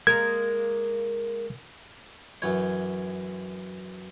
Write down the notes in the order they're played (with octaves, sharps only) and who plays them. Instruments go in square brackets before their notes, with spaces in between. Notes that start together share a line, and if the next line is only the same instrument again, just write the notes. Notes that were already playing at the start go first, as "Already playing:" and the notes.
[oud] G#3 A#3 A#4 [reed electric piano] G#6
[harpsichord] F#2 E3 C#5